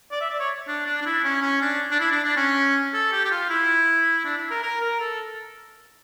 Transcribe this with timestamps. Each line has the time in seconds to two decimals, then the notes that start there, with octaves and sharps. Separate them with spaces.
0.11 D5
0.21 E5
0.30 D5
0.40 C#5
0.68 D4
0.86 D4
1.02 D4
1.06 E4
1.24 C#4
1.43 C#4
1.62 D4
1.91 D4
2.00 E4
2.12 D4
2.25 D4
2.37 C#4
2.94 A4
3.13 G4
3.25 G4
3.31 F4
3.50 E4
4.25 D4
4.37 E4
4.51 A#4
4.63 A#4
4.81 A#4
5.00 A4